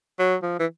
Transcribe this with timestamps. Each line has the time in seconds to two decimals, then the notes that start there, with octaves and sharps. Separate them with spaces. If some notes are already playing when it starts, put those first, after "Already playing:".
0.19 F#3
0.43 F3
0.59 E3